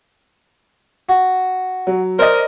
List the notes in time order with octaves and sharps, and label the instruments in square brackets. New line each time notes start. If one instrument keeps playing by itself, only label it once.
[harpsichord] F#4
[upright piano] F#3
[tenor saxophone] A#4 [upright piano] C5 D5 D#5